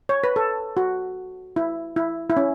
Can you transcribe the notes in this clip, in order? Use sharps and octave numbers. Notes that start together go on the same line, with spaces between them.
C#5
B4
A4
F#4
E4
E4
E4
C#4